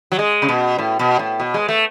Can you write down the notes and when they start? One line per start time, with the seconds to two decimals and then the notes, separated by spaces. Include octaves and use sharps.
0.12 F#3
0.19 G#3
0.42 C#3
0.49 B2
0.78 A2
0.99 B2
1.19 A2
1.40 B2
1.54 G#3
1.69 A3